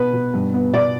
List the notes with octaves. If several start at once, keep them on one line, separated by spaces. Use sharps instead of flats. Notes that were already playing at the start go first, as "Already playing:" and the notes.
Already playing: B2 B4
B2
G2
B3
B2 D5